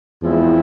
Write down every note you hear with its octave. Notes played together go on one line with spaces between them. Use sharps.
E2 F3 G#3 C4 E4 G#4